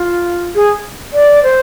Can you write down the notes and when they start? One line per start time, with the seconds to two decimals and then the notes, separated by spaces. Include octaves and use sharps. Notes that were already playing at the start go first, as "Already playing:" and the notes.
Already playing: F4
0.55 G#4
1.13 D5
1.43 C5